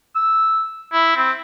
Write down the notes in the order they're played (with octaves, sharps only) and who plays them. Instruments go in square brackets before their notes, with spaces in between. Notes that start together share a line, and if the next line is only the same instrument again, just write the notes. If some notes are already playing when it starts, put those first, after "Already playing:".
[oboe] E6
E4
C4